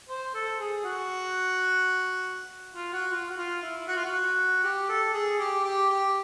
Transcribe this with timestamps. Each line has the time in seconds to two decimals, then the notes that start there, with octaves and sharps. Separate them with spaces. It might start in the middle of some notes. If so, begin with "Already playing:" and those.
0.09 C5
0.34 A4
0.59 G#4
0.84 F#4
2.74 F4
2.93 F#4
3.12 F4
3.30 F#4
3.37 F4
3.62 E4
3.88 F#4
3.96 F4
4.04 F#4
4.64 G4
4.89 A4
5.13 G#4
5.39 G4
5.64 G4
5.90 G4